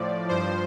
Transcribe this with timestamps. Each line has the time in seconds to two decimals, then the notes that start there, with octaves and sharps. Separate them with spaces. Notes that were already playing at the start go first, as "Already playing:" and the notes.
Already playing: A2 F3 D5
0.28 G2 F3 C5